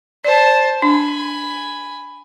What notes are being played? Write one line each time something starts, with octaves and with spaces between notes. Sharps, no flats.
C5 D5 A5
D4 G#5 B5